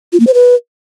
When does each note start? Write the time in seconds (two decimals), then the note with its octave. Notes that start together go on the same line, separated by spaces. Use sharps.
0.13 F4
0.20 A#3
0.27 C5
0.34 B4